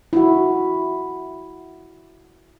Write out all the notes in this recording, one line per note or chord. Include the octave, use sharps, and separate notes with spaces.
E4 F#4